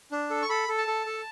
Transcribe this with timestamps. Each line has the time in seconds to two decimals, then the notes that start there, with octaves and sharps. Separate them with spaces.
0.12 D4
0.30 A4
0.42 C#6
0.49 A4 B5
0.68 A4
0.78 A5
0.87 A4
1.06 A4